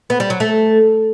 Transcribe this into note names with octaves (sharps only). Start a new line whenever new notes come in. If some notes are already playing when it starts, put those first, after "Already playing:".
B3
G3
F#3
A3